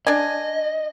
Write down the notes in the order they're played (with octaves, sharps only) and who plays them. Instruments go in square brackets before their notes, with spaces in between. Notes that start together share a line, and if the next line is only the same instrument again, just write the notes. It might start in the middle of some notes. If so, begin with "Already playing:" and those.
[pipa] D4 G#5 [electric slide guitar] D#5